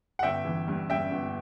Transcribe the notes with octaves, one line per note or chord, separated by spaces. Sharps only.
F#5
G1 E5 G5
E3
G2
G2 E5 G5
G1